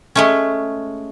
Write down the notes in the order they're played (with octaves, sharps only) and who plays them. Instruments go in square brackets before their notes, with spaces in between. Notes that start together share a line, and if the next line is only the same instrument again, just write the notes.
[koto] G#3 A3 C#4